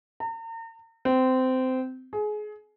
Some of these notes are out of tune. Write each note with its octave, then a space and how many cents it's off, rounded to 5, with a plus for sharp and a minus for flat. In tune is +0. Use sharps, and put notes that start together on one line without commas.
A#5 -40
C4 -20
G#4 +25